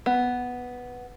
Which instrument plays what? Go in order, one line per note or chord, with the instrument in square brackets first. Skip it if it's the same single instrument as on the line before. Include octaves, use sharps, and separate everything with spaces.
[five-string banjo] B3